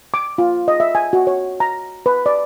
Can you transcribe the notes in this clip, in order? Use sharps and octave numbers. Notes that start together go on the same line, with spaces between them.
D6
F4
D#5
E5
G#5
F#4
C#5
A#5
B4
D5